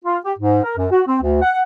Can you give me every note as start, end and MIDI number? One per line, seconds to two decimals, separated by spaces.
0.05 0.17 65
0.25 0.33 67
0.39 0.63 44
0.64 0.75 70
0.77 0.87 42
0.91 1.01 66
1.07 1.17 60
1.22 1.41 38
1.42 1.61 78